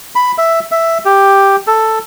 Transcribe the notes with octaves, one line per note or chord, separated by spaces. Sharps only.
B5
E5
E5
G4
A4